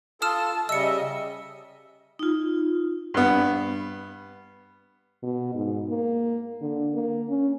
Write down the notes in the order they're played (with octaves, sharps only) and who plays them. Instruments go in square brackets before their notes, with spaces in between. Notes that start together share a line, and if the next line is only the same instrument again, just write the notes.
[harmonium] F4 A4 [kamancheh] A5 [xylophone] D#6 F6 E7
[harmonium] C#3 G3 E5 [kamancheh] D#5 [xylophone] E6 C#7
[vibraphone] D#4 F4
[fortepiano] G2 B3
[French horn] B2
G#2
A#3
D3
A#3
C#4